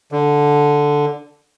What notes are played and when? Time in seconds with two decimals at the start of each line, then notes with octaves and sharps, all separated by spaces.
0.12 D3